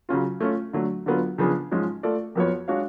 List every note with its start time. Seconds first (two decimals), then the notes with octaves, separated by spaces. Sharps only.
0.09 C#3 F#3 C#4 F4
0.41 A3 C#4 F4
0.73 D3 F#3 A3
1.06 D3 F#3 B3 F4
1.38 C#3 F3 B3 D4 G#4
1.71 G#2 F3 G#3 C#4
2.03 A3 F4 A4 D5
2.35 F2 F3 B3 F#4 C#5
2.68 G#3 D4 F#4 C#5 F5